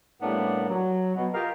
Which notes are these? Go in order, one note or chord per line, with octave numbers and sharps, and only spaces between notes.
A2 G3 A#3 B3 C#4 D4
F#3
B2
F4 G4 A#4 D#5 F5